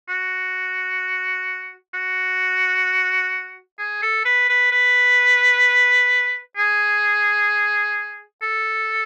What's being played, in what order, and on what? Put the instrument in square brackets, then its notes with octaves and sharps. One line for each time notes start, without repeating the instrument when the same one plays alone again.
[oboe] F#4
F#4
G#4
A4
B4
B4
B4
G#4
A4